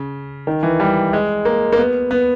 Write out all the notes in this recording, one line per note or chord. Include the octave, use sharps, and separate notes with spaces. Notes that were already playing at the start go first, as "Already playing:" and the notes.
Already playing: C#3
D#3
E3
G3
G#3
A#3
A#3
B3
B3